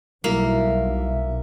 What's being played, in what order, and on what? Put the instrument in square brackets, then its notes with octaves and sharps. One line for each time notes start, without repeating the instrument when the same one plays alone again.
[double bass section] B1 [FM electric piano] F#3 G3 E4 [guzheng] A#3 [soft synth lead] E5